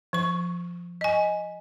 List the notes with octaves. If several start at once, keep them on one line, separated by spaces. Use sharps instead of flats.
F3 C#6
D#5 G#5